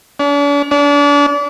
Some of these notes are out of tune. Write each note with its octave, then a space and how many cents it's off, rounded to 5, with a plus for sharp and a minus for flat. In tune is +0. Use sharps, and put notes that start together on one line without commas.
D4 -45
D4 -35